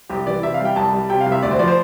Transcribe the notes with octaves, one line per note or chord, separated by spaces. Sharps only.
C2 G4
E3 D5
C3 E5
F5
G3
G5
C2 A5
G3
C3 G5
F5
C2
E5
D2 D5
C5
F3 D5
C5